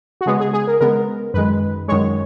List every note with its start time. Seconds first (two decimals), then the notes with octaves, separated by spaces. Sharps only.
0.21 F#4
0.26 C#3 G#3 B3 G#4
0.40 G#4
0.53 G#4
0.67 A#4
0.81 C#3 G#3 B3 A#4
1.34 F#2 D#3 G#3 B4
1.88 F#2 D#3 G#3 C#5